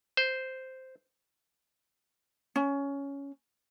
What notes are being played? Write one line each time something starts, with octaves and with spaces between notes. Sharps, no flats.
C5
C#4